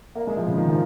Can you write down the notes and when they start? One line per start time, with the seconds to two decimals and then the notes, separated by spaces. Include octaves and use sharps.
0.15 A#3
0.27 G#3
0.37 F3
0.48 C#3
0.58 D#3
0.68 F3